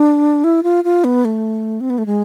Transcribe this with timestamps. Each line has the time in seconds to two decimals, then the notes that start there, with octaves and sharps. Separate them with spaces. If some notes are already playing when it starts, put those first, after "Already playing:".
Already playing: D4
0.44 E4
0.63 F4
0.84 F4
1.04 B3
1.25 A3
1.81 C4
1.90 B3
1.98 A3
2.06 G#3